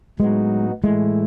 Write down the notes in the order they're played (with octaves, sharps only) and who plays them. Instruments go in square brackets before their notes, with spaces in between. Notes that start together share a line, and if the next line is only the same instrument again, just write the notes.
[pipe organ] A2 F#3 B3 D#4 F#4 [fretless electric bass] G#3
[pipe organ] A2 E3 A3 E4 [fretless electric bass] G#3